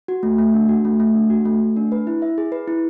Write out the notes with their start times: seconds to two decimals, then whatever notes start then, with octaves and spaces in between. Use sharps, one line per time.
0.08 F#4
0.23 A3
0.38 A3
0.54 D4
0.69 F#4
0.85 A3
1.00 A3
1.14 D4
1.30 F#4
1.45 A3
1.61 A3
1.76 D4
1.92 B4
2.07 E4
2.22 E5
2.38 G#4
2.52 B4
2.68 E4